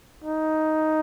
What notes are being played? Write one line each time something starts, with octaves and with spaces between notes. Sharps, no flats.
D#4